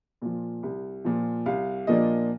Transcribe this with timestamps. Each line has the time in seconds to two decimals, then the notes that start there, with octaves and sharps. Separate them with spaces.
0.22 A#2 F3
0.63 C2
1.05 A#2 F3
1.46 C2 F5
1.87 A#2 F3 A#3 D4 D#5